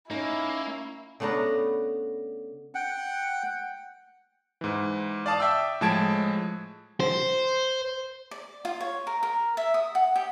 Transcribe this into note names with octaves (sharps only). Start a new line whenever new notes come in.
A#3 C#4 D#4 E4
C#3 A3 B3 D4 A#5
F#5 G5
G#2 E3
D5 F5 A5 D#6
E5 G5 D6 E6
A2 F3 G#3 A5 G#6 D7
C5
D5
F4
C#5
A#4
A#4
E5
D#6
F#5
G4